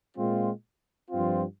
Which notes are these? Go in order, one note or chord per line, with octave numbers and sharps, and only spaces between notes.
A#2 G#3 C4 F4
G2 F3 C4 F4